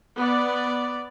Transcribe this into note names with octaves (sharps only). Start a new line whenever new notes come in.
B3 D5